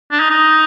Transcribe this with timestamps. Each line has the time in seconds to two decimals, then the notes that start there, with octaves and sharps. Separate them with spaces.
0.11 D4
0.20 D#4
0.30 D#4